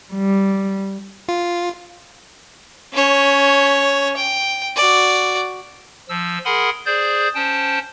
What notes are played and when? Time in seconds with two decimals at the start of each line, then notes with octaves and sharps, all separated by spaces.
0.12 G3
1.28 F4
2.93 C#4 C#5
4.17 G5
4.76 F#4 D5
6.09 F3 E6
6.45 G#4 A#4 F#5 G#5 B5 C6
6.86 G#4 C5 D5 G6
7.35 C#4 C5 G5 A5